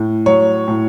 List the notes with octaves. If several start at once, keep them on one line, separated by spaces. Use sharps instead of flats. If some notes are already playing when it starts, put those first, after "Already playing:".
Already playing: A2
F#3 C#5
A2